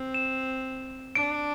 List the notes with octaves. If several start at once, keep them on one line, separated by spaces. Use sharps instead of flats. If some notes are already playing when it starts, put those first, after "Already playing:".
Already playing: C4
E7
D4 D7